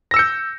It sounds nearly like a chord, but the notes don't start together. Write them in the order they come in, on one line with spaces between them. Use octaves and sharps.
A#6 E6 C#7 G6